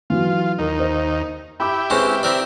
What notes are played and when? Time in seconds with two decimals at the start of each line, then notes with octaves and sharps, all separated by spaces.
0.10 E3 F#3 F4
0.58 D#2 D#4 A#4
0.80 C5
1.60 E4 G4 B5 D6
1.90 G#3 C4 C#4 B4 C#6
2.23 C4 A#4 D5